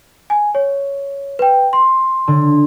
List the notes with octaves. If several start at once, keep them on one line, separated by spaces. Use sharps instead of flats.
G#5
C#5
B4 G5
C6
D3